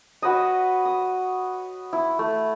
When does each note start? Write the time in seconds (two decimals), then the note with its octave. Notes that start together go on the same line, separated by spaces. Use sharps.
0.22 F#4 B4 C#5 D#5
0.85 D#6
1.93 E4
2.19 A3